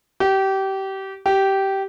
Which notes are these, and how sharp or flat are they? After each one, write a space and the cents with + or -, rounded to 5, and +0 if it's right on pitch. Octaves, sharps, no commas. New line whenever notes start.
G4 -25
G4 -15